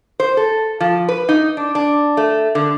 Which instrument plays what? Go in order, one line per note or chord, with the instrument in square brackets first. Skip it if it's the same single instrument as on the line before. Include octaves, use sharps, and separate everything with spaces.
[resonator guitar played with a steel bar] C5
A4
F3
B4
D#4
D4
D4
A3
D3